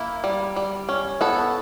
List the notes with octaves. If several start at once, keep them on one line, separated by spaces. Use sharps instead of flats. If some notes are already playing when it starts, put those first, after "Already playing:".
Already playing: A#3 E4
G3
G3
C#4
B3 A4